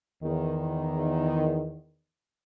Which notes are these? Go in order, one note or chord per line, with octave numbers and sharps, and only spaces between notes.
E2 D#3